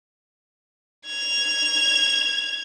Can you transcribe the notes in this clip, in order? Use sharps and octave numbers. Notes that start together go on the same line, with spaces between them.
G#6 F7